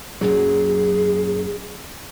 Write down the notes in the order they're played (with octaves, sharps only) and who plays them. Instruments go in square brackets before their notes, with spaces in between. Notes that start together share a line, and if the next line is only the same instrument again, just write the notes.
[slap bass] F#2 A#2 F#3 [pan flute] G#4